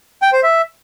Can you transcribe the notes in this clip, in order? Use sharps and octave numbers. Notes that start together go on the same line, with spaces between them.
G5
C5
E5